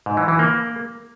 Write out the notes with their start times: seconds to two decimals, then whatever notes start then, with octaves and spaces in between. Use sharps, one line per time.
0.06 G#2
0.17 E3
0.28 E3
0.39 A#3